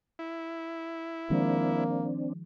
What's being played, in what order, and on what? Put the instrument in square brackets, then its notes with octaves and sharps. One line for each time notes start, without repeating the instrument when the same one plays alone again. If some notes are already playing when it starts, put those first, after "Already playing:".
[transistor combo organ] E4
[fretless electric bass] D#3 F3 G#3 [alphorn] A#3 [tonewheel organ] C4 D4